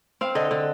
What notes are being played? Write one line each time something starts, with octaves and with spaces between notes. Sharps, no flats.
C4 F5
D3 D#5
D3